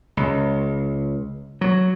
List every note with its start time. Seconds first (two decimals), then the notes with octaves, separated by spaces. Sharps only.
0.17 C#2
1.61 F#3